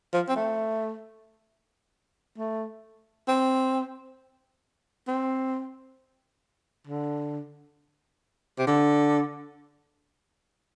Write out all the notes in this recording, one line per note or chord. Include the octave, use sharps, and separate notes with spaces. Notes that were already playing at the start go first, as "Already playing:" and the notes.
F3
C4
A3
A3
C4
C4
D3
C3
D3